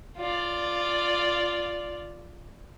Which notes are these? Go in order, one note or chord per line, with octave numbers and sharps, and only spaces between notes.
F4 D5